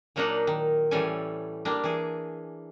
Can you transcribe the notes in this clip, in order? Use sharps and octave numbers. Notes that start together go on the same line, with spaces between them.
A#2 F#3 A#3 D4 D#4 F#5
D#3
A2 E3 G3 C#4 A4 G#5
G3 A#3 D4
E3 G#4